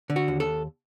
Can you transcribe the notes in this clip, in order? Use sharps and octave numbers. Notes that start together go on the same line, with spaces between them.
D3
F#4
D#2
A4